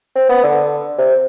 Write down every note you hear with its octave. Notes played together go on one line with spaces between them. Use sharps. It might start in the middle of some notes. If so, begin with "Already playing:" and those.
C4
B3
D3
C3